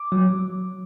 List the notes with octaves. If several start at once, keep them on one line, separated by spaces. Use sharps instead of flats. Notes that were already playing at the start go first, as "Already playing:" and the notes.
Already playing: D6
F#3